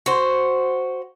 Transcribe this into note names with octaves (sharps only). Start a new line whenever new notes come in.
F#4 C5